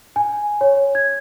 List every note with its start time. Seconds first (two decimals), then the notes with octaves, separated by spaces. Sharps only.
0.16 G#5
0.61 C#5
0.95 G#6